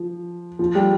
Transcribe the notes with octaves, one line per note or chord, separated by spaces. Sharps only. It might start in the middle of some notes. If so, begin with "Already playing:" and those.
Already playing: F3
F3
G3